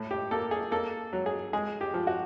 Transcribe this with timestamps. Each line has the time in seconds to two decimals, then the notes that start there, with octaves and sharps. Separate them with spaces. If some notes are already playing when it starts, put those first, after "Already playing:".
Already playing: A2
0.11 G4
0.31 A#3 A4
0.51 G#4
0.72 A#3 A4
1.13 F#3
1.26 G#4
1.53 G#3 G#4
1.81 G4
1.94 F3
2.07 F#4